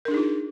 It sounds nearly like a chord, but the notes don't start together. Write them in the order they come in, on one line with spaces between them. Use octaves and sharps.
A#4 D4 G#4 D#4 F4